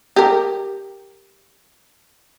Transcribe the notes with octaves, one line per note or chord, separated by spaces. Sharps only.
G4 A#4